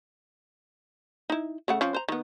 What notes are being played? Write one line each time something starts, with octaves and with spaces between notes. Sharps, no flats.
D#4 E4
C#3 A3 F#5
F3 C4 C#4
C5 A#5
D#3 B3